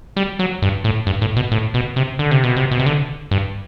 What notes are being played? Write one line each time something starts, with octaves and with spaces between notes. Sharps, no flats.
G3
F#3
G2
A2
G2
A2
B2
A2
B2
C3
D3
C3
B2
C3
B2
C3
D3
G2